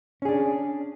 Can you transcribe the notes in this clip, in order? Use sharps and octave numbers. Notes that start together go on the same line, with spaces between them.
C#4 D4 G#4